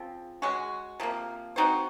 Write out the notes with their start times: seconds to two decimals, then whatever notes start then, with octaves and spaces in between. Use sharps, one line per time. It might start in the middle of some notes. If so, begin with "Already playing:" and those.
Already playing: C#3 F3 C4
0.42 G#3 C#4 F#4
1.00 C3 F3 A#3
1.56 C4 D#4 F#4 C5